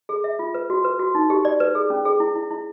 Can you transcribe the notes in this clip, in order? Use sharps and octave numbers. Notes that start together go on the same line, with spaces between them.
G#4
E5
F4
B4
F#4
B4
F#4
D#4
G4
D5
B4
G#4
C#4
G#4
E4
E4
E4